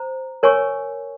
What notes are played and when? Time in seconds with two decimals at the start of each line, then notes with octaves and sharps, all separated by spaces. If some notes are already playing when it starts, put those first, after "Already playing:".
Already playing: C5 A#5
0.43 A#4 C#5 G#5 C#6